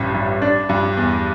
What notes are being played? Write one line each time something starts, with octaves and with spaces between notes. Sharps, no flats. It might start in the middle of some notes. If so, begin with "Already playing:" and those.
Already playing: A1 G2
G2
D4
G2
E2